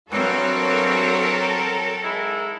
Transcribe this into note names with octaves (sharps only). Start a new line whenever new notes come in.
G2 E3 F#3 C4 F#4 A4 A#4 C#5
G#2 G#3 E4